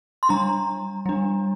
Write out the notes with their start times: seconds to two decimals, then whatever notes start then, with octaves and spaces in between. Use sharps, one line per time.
0.23 C6
0.29 G3 D4 A#5
1.06 G3 D4